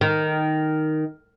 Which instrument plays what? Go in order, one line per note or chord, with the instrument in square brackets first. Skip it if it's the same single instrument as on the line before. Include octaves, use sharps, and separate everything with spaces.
[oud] D#3